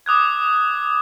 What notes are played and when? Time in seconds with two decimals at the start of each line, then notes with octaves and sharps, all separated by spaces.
0.06 D6 D#6 F#6 G#6